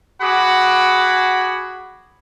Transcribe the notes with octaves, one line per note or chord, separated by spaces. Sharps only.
F#4 G#4 F#5 B5 D6